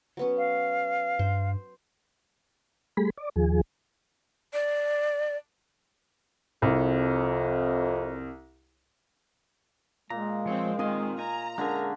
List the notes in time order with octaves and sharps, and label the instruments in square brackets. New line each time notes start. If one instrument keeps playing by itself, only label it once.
[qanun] F#3 B3 C#4
[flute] F5
[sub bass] G2 [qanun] C5
[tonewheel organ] G3 A3 G#4 B5
D5
D#2 F3 G#4
[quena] D5
[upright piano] C2 [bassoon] F2
[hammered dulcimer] A#2 [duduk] G#3 [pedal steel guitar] A#5
[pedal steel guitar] F3 C#5 [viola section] C4
[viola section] D#3 [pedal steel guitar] C4 G#5 C6 [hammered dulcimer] F4 D#5 F5
[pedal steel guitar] G#5 [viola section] A#5
[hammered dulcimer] D3 C#4 E5 [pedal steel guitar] G#3 G#4 [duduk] A#4